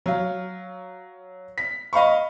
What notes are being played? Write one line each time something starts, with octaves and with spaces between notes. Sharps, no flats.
F#3 F5
B6
D#5 F5 B5 C#6